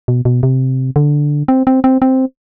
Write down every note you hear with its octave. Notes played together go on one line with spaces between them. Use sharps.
B2
B2
C3
D3
C4
C4
C4
C4